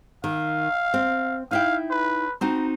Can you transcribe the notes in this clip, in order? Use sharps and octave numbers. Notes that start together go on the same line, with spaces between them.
D#3 F5
C4
D#4 E4 F5 G5
B4
C4 D#4 F#4 A#5